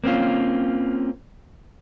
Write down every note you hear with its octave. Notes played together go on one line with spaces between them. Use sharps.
A#3 C4 C#4 F4